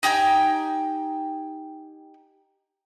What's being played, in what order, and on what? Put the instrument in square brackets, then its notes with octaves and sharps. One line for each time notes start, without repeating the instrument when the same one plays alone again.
[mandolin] D#4 G4 G5 G#5